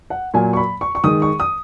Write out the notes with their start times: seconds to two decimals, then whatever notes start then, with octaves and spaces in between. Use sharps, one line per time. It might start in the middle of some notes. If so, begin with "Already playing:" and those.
0.10 F#5
0.34 A#2 F#3 A#3 G#5
0.53 C#6
0.57 B5
0.81 C#6
0.95 C#6
1.04 D#3 G#3 D#6
1.22 C#6
1.40 D#6